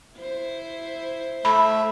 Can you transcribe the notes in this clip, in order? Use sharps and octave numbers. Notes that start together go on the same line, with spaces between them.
E4 C5
A3 E5 B5